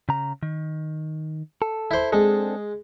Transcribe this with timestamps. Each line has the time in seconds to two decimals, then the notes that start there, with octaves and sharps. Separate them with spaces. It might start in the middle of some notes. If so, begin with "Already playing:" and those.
0.09 C#3 A#5
0.43 D#3
1.62 A4
1.91 E4 C5
2.13 G#3 C4 D4 A4